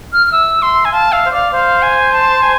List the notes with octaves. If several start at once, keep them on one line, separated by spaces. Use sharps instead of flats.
F6
F6
E5 E6
E5 C6
G#5
F5 A5
E5 F5
C5
D5 F5
C5 F5
G#5
A5
G#5